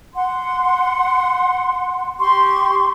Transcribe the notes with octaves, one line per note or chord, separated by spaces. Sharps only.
F#5 C6
G4 C6 C#6